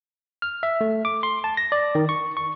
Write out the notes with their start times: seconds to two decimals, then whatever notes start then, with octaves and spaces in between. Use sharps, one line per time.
0.42 F6
0.63 E5
0.81 A3
1.05 D6
1.23 C6
1.44 A5
1.57 A#6
1.72 D5
1.95 D#3
2.09 C#6
2.37 C#6